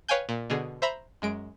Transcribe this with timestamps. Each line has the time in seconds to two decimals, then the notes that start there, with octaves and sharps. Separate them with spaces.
0.09 B4 C#5 F5 G5 G#5 G6
0.29 A#2
0.50 B2 D3 G#4
0.82 C5 E5 A#5 B5
1.22 F#2 G#3 D7